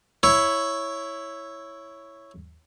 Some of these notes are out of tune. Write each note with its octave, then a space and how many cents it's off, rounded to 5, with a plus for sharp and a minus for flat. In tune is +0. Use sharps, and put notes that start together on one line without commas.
E4 +0 C#5 +0